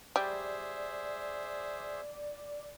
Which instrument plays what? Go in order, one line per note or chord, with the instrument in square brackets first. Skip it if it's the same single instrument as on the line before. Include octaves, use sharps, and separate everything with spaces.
[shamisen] G3 [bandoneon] G#4 C5 E5 [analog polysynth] D5